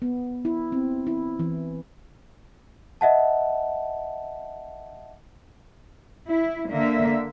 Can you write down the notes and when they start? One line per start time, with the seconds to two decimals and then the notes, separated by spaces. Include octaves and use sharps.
0.02 B3
0.45 E4
0.72 C4
1.07 E4
1.39 E3
3.01 D#5 E5 F#5 A5
6.30 E4
6.71 D3 A#3 E5